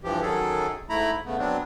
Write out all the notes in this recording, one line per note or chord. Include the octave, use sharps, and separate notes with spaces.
G2 E3 F3 G4
F#2 D#3 F#3 G#4 A4
G#2 A3 E4 A#5 B5
C#3 A3 B3
F#3 B3 C4 D4